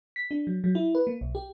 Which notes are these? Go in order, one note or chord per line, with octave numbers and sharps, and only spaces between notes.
B6
D4
F#3
F#3
E4
B4
A#3
B1
G4